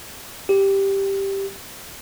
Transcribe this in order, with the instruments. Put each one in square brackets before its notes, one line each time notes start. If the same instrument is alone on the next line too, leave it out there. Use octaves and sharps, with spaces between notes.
[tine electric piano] G4